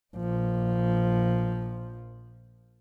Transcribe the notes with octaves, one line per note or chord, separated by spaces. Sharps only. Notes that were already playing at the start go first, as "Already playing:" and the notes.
A#1 F3